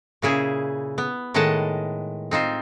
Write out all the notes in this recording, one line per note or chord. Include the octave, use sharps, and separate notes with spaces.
A#2 C#3 E4 G#4
B3
A2 D#3 G#3 D#5 F#5 A5
C4 D#4 F4 C5